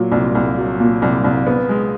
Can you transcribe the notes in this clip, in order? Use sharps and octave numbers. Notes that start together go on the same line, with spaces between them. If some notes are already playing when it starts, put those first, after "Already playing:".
Already playing: A#2 F#3
C2
C2
F#3
A#2
C2
C2
B3
G#3